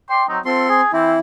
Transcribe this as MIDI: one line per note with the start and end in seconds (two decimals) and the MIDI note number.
0.09 0.23 74
0.09 0.23 79
0.09 0.23 84
0.29 0.39 54
0.29 0.39 60
0.29 0.39 63
0.45 0.81 60
0.45 0.69 65
0.45 0.69 69
0.45 0.81 84
0.70 0.89 68
0.93 1.15 52
0.93 1.15 60
0.93 1.19 64